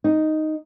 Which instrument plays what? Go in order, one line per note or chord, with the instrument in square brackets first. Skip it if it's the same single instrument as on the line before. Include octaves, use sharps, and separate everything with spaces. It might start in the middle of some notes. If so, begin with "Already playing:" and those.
[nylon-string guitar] D#4